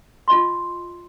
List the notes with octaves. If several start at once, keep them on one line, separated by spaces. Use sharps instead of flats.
F4 D#5 C6